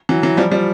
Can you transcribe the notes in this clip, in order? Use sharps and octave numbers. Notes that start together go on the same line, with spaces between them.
E3 F#3
E3 F#3
F3 G3
F3 G3